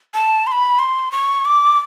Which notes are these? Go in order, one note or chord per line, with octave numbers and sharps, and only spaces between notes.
A5
C6
B5
C6
C#6
D6